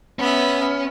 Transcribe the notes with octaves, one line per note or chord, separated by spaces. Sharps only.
B3 C#4 E5